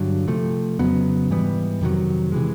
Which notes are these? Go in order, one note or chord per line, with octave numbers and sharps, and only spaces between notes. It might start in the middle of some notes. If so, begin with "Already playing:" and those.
Already playing: G2 D3 F#3
C3 F3 A3
F2 C#3 F#3 B3
G#2 E3 G3 B3
F2 C3 D#3 F#3
C3 E3 G#3